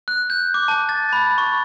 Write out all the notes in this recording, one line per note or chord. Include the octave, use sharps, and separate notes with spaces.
F#6
G6
D6
A5
A6
B5
C#6